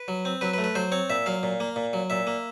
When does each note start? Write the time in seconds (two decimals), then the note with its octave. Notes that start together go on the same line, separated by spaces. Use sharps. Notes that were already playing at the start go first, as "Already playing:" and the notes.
Already playing: B4
0.08 F#3
0.25 C4
0.41 F#3 B4
0.53 B4
0.58 A3
0.64 B4
0.75 F#3 C5
0.92 C4 C#5
1.10 A#2 E5
1.26 F#3 F5
1.43 A#2
1.60 A#3
1.76 A#2
1.93 F#3
2.10 A#2 E5
2.27 A#3